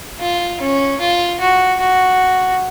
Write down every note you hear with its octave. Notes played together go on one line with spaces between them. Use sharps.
F4
C#4
F4
F#4
F#4